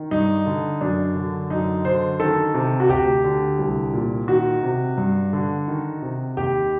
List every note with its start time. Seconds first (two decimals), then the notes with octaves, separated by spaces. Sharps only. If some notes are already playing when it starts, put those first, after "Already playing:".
Already playing: D#3
0.11 G2 D#4
0.46 D3
0.81 F#2 D4
1.15 D3
1.50 F#2 D#4
1.85 D3 C5
2.20 D#3 A4
2.54 C3
2.80 F#4
2.89 D2 G4
3.24 D3
3.59 C2
3.93 A#2
4.28 D#3 F#4
4.63 C3
4.98 G2
5.33 D3
5.68 D#3
6.02 C3
6.37 D#2 G4